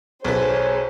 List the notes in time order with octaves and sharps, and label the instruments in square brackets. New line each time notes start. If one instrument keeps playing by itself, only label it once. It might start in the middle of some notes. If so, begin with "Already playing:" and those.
[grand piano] B1 B3 [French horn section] G#4 C#5 [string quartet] C5